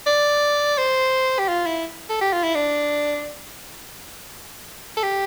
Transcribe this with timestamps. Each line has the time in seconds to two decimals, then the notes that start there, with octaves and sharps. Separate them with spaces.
0.07 D5
0.78 C5
1.39 G4
1.48 F4
1.66 E4
2.10 A4
2.21 G4
2.33 F4
2.43 E4
2.55 D4
4.97 A4
5.03 G4